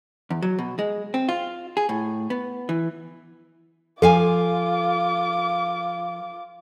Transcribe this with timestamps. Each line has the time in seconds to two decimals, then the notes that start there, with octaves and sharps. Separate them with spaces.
0.30 E2
0.42 F#3
0.59 B2
0.79 G#3
1.14 C4
1.29 F4
1.77 G#4
1.89 A2
2.30 B3
2.69 E3
4.02 F3 F4 A4 F5 G#5 D6